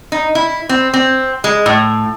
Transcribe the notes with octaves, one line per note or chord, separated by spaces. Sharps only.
D#4
E4
C4
C4
G#3
A2